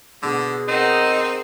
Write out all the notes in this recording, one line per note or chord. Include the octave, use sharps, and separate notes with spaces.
B2 D3 G#4
C4 D#4 A#4 F#5